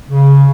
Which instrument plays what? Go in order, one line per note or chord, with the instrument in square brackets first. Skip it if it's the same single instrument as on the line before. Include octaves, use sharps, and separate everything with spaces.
[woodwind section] C#3